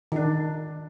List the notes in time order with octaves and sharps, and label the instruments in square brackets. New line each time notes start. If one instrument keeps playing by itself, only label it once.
[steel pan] D#3 D4